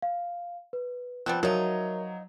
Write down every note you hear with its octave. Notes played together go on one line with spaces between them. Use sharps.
F5
B4
F3 G3 B3 C4 F#6
F3 F#3 D#4 A#4 C#5 E5